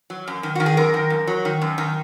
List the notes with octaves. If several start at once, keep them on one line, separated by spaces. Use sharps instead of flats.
F#3
F#2
D#3
D#3 F#4
G#4
F#2 A#4
D#3
F#2
F#3
D#3
F#2
D#3